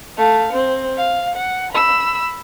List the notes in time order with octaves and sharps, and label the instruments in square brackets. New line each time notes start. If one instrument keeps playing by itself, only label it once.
[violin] A3 F5
C4
F5
F#5
B5 E6